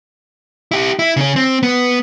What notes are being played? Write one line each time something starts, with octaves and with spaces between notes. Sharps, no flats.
E4 G4
E4
C#3 C#4
C4
B3